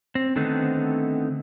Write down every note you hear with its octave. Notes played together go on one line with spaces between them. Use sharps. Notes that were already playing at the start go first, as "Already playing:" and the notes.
C4
D3 D#3 A3 B3 C4 D#4